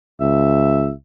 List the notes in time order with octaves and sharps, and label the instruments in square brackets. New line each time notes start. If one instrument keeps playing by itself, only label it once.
[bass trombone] C#2 [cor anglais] E5